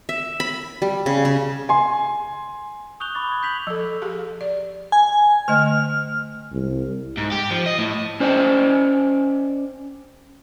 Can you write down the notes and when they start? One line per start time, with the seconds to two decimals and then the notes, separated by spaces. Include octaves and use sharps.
0.09 E5
0.40 B5
0.82 G3
1.06 C#3
1.25 C#3
1.69 G#5 C6
3.00 C#6 D#6 F#6 G6 F7 G7
3.15 B5 C#6 D6 A6
3.29 D#6 G#6
3.43 G6 B6 F7 F#7
3.67 F3 A4
4.02 G4 G#4
4.41 D5
4.92 G#5
5.48 D3 A3 D#5 F6
6.53 C2
7.18 G#2
7.32 G4
7.51 F3
7.66 D#5
7.78 A2
8.20 C#4 C5 D5 D#5 G5 A5